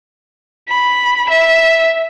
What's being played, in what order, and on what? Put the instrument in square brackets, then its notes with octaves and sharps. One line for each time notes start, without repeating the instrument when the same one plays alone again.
[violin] B5
E5